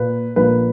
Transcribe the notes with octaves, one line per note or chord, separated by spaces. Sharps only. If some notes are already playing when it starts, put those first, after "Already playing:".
Already playing: A#2 A#3 B4
A#1 A#2 A#3 B4